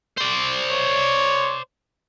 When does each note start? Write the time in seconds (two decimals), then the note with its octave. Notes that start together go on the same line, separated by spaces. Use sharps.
0.17 C5 D5
0.71 C#5